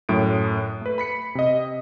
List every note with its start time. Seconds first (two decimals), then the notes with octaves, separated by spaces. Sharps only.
0.09 F#2 A2 D7
0.81 A3 B4
0.98 B5 B6 C#7
1.35 C3 D#5